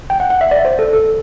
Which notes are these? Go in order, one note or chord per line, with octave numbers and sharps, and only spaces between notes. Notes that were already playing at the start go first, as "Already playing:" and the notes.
G5
F#5
F#5
E5
D5
C5
A4
A4